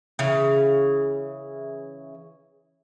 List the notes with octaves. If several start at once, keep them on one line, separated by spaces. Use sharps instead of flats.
C#3 E3